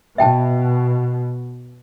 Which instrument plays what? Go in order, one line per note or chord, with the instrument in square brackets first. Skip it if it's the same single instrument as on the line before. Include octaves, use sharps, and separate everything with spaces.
[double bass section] B2 [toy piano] E5 G5 A5